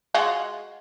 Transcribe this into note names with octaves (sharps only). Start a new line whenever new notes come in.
G#3 F4 F#4